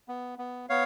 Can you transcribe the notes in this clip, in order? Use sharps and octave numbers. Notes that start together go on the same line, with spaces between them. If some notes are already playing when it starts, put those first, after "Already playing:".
B3
B3
B3 C#5 F5